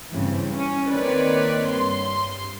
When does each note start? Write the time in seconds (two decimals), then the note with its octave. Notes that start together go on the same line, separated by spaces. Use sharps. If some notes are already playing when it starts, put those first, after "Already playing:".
0.13 G2 C#3 E3 C4
0.50 C#4
0.88 D#3 A#3 C4 B4 C#5 D5
1.68 G2 C6